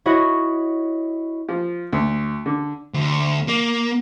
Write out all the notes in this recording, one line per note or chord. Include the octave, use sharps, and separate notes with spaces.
E4 F#4 C#5 D#5
F3
D2
D3
D2
A#3